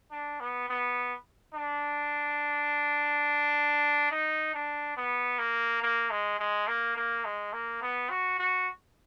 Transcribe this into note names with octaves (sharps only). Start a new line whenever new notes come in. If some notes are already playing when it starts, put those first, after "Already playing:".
D4
B3
B3
D4
D#4
D4
B3
A#3
A#3
G#3
G#3
A#3
A#3
G#3
A#3
B3
F#4
F#4